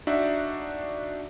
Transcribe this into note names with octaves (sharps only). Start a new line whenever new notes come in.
D4 D#4 F#4 E5